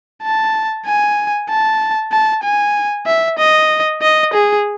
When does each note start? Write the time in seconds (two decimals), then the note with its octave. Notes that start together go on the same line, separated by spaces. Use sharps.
0.23 A5
0.86 G#5
1.50 A5
2.12 A5
2.43 G#5
3.06 E5
3.38 D#5
4.02 D#5
4.34 G#4